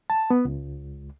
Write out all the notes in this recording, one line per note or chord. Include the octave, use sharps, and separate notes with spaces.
A5
B3
C#2